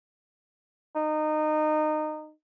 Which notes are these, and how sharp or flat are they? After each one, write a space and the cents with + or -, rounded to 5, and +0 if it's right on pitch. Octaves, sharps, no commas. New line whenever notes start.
D#4 -25